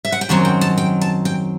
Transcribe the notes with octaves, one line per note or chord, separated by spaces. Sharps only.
E5
F#5
G5
F#2 D#3 F#3 C4 A5
G5
A5
G5
A5
G5